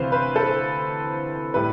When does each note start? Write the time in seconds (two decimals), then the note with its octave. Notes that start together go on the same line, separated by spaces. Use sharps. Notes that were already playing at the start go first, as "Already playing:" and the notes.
Already playing: D2 C3 E3 B4 C5 F5
0.12 B4
0.36 A4
1.54 A2 G3 B4